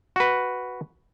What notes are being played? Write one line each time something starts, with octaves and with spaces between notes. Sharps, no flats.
F#4 B4